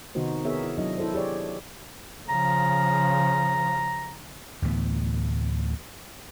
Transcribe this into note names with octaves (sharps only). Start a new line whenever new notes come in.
C3 D#3 B3 D#4 F#4 C5
B3 G#4 A#4 C#5 E5
E4
F#3 D4 E4 D#5
E4 A4 C5
G4 G#4 C#5 D5
C#3 F3 A#5
D2 A2 E3 B3